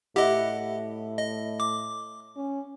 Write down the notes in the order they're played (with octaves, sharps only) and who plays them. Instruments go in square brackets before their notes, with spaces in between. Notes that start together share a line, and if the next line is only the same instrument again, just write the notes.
[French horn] A2 [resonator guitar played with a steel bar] E4 F#5 [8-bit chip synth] G4 D#5
[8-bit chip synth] D#5
D6
[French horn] C#4